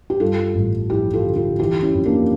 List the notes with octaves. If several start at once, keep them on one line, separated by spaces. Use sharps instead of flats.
G4
G2 F4 A4
A1
F3 E4 G4
F4 A4
D3
F4 A4
E3 E4 G4
C#4 E4
F2
A#3 D4